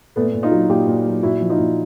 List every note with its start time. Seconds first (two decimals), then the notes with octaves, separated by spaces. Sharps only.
0.16 A#2 A3 B3
0.34 A#2
0.43 D#4 F4
0.52 F#3
0.69 A#2 F4 G4
0.88 A#2
1.06 F#3
1.23 A#2 E4 F#4
1.41 F3
1.50 D#4 F4
1.58 A#2